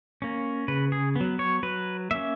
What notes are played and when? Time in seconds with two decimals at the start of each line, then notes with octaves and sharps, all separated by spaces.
0.22 A#3 C#4
0.68 C#3 B4
0.92 G#4
1.16 F#3 B3
1.39 C#5
1.63 F#3 B4
2.11 A#3 C#4 E5